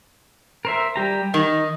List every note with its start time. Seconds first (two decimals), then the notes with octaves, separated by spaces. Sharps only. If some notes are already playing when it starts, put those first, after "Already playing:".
0.65 A#4 C5 E5
0.96 G3 G4 A#5
1.34 D#3 D#4